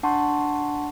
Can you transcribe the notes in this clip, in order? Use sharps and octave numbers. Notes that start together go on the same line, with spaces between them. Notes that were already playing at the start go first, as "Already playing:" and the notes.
D4 F#5 A5 C6 C#6